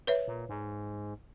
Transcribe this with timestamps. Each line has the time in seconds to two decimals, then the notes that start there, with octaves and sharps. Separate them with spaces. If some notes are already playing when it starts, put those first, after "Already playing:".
0.07 B4 C#5 E5
0.27 A#2
0.49 G#2